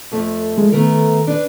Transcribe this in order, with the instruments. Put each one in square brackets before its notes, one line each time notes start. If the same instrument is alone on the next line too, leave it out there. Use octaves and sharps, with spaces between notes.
[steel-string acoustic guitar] F2 A3
[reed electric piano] G#3
[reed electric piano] D#3 [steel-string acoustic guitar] A3 B3 A#4
[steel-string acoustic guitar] D4 B4